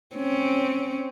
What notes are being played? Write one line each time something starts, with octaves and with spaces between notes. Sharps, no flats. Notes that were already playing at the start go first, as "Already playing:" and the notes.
C4 C#4